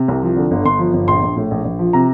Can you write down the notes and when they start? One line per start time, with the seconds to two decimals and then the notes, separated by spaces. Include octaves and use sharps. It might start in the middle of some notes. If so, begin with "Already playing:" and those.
Already playing: C3
0.08 C2
0.23 F3
0.36 D3
0.51 G1
0.65 G1 C6
0.79 F3
0.94 G1
1.08 A#1 C6
1.22 A#1
1.36 A2
1.51 A#1
1.65 A#1
1.79 F3
1.93 C3 A#5